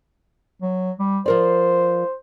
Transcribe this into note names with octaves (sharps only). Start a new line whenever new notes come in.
F#3
G3
F3 A#4 C5 D5